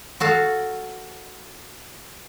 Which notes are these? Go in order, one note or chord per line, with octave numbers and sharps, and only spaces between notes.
F#4 A4 F5